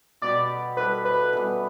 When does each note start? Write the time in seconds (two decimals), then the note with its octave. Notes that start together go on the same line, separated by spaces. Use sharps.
0.22 B2 B3 G4 D5
0.77 G3 E4 A4 B4
1.05 B4
1.33 E3 G3 B3